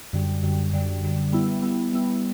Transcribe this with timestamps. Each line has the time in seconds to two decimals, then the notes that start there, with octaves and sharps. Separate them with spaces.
0.13 F#2 D3 G3
0.43 F#2 D3 G3
0.72 F#2 D3 G3
1.03 F#2 D3 G3
1.32 G3 B3 E4
1.62 G3 B3 E4
1.92 G3 B3 E4